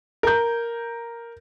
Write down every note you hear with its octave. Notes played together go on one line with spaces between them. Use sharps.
A#4 G6